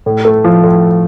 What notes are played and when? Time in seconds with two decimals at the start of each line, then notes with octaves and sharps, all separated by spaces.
0.06 A2
0.25 A3
0.44 F3
0.63 A2